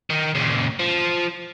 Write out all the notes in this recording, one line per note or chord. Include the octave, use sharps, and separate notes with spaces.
D#3
A#2 C#3
F3